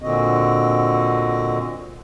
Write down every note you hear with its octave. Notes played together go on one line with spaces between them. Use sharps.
A#2 D3 C4 F#4 D#5